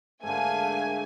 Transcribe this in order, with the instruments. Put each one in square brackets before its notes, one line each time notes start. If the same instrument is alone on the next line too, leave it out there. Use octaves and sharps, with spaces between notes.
[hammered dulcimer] G#2 D3 [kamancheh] A3 A#3 [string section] G#5